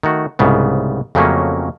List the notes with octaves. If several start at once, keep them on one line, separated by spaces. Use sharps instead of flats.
D#3 A3 F#4
C2 G#2 C#3 B3
F2 C#3 F#3 A3 A#3 C#4